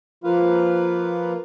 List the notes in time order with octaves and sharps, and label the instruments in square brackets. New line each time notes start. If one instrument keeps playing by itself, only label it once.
[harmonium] F3 A#3 F4 B4 F5